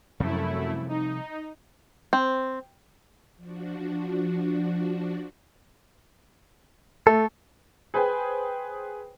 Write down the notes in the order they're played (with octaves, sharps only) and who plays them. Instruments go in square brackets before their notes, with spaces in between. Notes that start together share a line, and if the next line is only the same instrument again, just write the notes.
[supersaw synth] F#2 A3 E4 [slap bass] C3 F3 G3
[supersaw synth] D#4
[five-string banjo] C4
[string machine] F3 D4 F#4
[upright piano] A3 [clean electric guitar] A4
[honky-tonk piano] G#4 B4 C5 G5 G#5